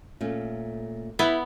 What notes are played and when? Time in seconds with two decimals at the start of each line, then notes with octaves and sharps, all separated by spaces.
0.21 A#2 A3 C#4
1.19 B3 E4